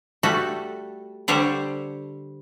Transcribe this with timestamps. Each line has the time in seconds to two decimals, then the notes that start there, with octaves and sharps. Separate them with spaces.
0.23 G3 A3 F#4 A4
1.28 D3 G3 C5 C#5